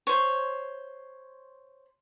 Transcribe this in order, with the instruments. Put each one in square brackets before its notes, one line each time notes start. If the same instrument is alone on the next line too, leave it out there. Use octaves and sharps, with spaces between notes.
[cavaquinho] C5 C#5